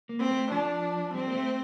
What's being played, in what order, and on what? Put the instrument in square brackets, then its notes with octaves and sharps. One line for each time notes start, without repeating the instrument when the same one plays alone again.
[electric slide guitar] A#3
[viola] C4
[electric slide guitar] A3
[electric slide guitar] F3 [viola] D4
[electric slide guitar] G3 [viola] C4
[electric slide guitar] A#3
A3